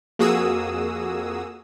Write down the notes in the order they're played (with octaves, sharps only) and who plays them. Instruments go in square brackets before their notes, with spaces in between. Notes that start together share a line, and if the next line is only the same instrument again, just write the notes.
[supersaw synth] F2 A#3 F#4 G#4 D#6 E6